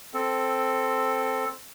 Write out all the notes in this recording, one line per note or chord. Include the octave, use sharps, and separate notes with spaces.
C4 A4